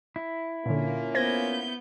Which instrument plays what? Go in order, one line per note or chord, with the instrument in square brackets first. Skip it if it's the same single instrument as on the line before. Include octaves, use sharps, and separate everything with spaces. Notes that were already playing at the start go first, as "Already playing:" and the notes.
[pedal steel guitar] E4
[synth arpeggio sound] A#2 D3 [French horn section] A#3 C#4 F4
[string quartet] B3 G6 [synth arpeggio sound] C5 G#6 A#6